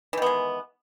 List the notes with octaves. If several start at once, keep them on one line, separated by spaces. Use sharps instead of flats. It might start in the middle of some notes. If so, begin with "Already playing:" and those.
D#3 E3 G#3 B3